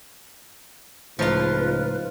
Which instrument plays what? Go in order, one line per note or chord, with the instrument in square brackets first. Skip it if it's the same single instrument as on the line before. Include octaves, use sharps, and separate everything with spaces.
[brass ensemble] C#2 [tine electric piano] A2 D#4 [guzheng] F3 F4 [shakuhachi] B4